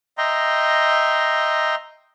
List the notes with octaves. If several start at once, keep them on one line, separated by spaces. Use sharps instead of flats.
D#5 E5 G5 A#5 C6